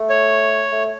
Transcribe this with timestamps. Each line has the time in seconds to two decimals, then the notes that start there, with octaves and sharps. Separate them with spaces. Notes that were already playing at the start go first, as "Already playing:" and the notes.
Already playing: A3
0.10 C#5
0.72 A3